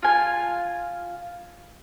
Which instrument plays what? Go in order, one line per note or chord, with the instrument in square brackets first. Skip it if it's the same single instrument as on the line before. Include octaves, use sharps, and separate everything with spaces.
[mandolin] F4 G#5